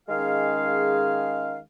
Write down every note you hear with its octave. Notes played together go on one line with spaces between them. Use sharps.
D#3 G#3 C#4 G#4 F5